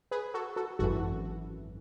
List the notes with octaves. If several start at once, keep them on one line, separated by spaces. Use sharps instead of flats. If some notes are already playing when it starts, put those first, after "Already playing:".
G#4 B4
F#4 A4
F#4 A4
G#1 F#2 E3 F#4 A4